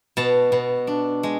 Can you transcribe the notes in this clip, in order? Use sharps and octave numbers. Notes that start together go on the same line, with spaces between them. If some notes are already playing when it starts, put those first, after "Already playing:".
B2 A5
B2
D4
G#3